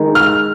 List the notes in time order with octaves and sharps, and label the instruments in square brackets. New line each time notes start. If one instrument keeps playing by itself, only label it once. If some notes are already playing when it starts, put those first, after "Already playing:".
Already playing: [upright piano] D#3 G#3 D#4 A#4
[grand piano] F6